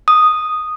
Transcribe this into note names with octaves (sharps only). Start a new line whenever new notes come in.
D#6